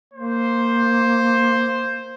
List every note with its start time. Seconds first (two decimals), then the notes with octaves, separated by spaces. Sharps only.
0.14 A#3 C5